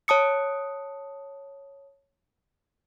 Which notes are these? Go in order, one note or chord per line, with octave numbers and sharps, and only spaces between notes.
C#5 A5 D#6 C#7